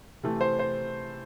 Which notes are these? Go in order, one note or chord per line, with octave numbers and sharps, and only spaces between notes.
C3 E3 A3
C5
C5